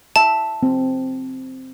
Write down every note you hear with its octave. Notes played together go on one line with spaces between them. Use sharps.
E5 A5
C4